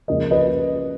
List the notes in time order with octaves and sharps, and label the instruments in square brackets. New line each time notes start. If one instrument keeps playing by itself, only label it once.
[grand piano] C#2 C#3 F3 A#3 D#5
B4 D#5